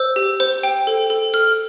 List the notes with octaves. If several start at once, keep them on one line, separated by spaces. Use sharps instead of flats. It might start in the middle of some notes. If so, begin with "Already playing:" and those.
Already playing: C5 E6
G4
C5
G5
A4
A4
A4 F6